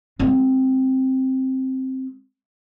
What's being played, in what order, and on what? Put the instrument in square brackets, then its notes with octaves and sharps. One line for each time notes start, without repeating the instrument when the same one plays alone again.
[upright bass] G#3 C4